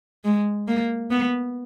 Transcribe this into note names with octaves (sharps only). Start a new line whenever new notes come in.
G#3
A#3
B3